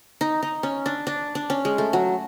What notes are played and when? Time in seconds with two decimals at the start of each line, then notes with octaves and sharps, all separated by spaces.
0.21 D#4
0.43 D#4
0.63 C#4
0.86 D4
1.07 D4
1.35 D4
1.50 C#4
1.65 G#3
1.78 A3
1.93 F#3